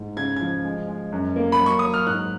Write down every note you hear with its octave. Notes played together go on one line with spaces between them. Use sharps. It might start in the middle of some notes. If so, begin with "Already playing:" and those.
Already playing: G#2
C#3 G#6
F3 G#6
G#3
G#3
F#2
A#3
B5
F#3
C#6
F#3 D#6
F6
G#2 F#6